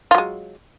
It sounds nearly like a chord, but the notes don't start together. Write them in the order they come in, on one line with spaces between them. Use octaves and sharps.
F4 F#3 G#3